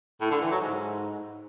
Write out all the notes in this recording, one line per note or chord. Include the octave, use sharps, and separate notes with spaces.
A2
D3
E3
F#3
G#2